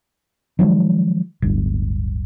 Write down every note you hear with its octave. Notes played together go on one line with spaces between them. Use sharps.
D#3 F3 F#3 G#3
D1 G1